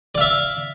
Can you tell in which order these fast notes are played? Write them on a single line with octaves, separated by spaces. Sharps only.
D5 F5 E5